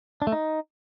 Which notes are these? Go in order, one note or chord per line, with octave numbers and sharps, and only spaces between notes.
D4
A3
D#4